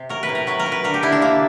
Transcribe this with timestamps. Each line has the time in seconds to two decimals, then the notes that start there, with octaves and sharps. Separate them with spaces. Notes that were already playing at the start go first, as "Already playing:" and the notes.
Already playing: C3
0.09 F#3 A#4
0.23 B4
0.29 A2
0.35 A#4
0.47 F#3 B4
0.59 A#4
0.66 F#3
0.72 B4
0.84 D3 A#4
0.94 G4
1.03 D3 E4
1.12 D4
1.22 C3 A#3